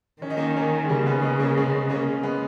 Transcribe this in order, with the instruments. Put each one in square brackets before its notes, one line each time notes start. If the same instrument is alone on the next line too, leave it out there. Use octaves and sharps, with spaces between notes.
[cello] D#3 [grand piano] C#4
[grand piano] D#4
A#3 C#4
D#4
A#3 C#4
G#3
[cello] C#3 [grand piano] G3 A#3
[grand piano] G#3 B3
B3 D#4
A#3 C#4
G#3 B3
A#3 C#4
G#3 B3